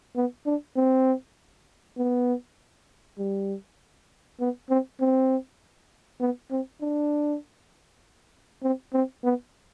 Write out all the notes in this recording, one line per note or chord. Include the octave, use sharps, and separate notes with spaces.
B3
D4
C4
B3
G3
B3
C4
C4
B3
C4
D4
C4
C4
B3